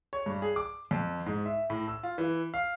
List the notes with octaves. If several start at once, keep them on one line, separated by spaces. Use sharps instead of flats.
C#5
G2
G#4
D6
F2
G#2
E5
A2
E6
F4
E3
F5